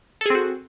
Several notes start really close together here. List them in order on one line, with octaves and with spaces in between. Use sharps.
A4 G#4 C4 F#4